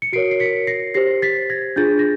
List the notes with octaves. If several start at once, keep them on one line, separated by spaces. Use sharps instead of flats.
C#7
F#4 A#4 C#5 C7 D7
C7
B6 C#7
A#6 C7
G4 C5 A#6 C7
A6 B6
G#6 A#6
D4 F4 G#4 G6 A6
A#6